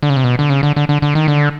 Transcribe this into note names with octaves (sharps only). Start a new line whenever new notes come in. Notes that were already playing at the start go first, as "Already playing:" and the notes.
D3
C#3
C3
B2
D3
C#3
D3
D3
D3
D3
D#3
D3